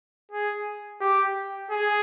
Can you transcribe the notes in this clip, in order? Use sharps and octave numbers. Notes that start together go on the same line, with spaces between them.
G#4
G4
G#4